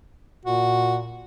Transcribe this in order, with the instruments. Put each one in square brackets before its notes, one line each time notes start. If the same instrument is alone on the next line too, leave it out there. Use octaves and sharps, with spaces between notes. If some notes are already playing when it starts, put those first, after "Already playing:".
[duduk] A#2 [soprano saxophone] F#4